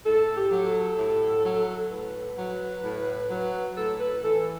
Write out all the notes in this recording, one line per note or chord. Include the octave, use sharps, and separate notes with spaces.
A2 A4
G4
F#3
A4
A2
F#3
A2 B4
F#3
A2
F#3
A2 A4
B4
E3 A4